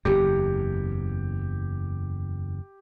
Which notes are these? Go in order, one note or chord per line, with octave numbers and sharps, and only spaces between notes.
F#1 E2 G4